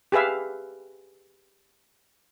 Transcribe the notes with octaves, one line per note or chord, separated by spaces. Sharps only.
G4 G#4 B4 E5 F5